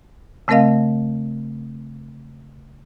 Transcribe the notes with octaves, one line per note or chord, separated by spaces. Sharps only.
C#3 A3 C4 A#4 D#5 F5